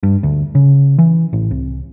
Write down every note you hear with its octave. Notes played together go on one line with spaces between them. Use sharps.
G2
D2
C#3
E3
A1
C2